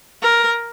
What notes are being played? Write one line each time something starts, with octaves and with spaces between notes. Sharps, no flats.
A#4